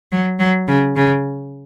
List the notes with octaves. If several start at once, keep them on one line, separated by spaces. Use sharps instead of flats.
F#3
F#3
C#3
C#3